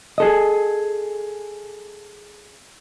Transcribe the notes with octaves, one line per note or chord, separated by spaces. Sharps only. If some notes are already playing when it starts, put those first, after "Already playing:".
G#4 A4 D#5